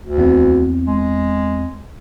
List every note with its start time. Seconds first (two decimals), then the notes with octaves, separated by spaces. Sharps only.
0.04 D2
0.18 E2 C4
0.87 G#3